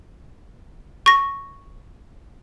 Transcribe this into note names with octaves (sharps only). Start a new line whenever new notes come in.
C#6 A#6